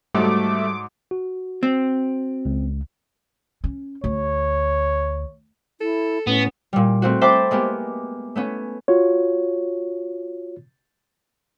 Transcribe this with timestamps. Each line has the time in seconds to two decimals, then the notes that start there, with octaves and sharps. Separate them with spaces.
0.14 G#2 F#3 G3 A3 D6
1.11 F#4
1.63 C4
2.45 C#2
3.64 C#4
4.04 D2 C#5
5.81 E4 A4
6.27 A2 B3 C#4
6.73 A#2 G3
7.02 A3 C4 F#4
7.21 C5 E5 G5 A5 B5 D6
7.51 G#3 A#3 B3 G4
8.35 A3 B3 C#4
8.88 F4 F#4 C#5